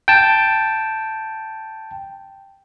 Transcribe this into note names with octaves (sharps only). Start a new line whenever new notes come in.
G5 A5